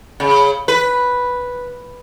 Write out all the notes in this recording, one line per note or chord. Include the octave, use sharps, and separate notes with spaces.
C#3
B4